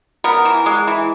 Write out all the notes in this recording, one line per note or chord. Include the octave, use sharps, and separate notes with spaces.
B3 A#4
E3
G#3
E3